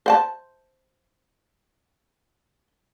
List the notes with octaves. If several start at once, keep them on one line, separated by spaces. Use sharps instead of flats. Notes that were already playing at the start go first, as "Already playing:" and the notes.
C5 F#5 A5